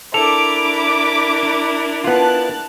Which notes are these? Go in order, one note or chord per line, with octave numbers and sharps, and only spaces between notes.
D4 E4 A4 A#4 B5 D6 F7
B3 F4 A5 F#6